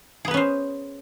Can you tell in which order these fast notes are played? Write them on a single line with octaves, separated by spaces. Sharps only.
G#4 B3 B4 C#4 C5